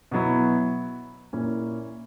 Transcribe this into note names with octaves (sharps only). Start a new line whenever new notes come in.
B2 F#3 B3 E4
A#2 A#3 C#4 E4